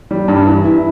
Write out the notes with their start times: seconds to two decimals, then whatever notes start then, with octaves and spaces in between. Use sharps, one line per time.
0.11 G3
0.28 G2
0.46 E3
0.64 E4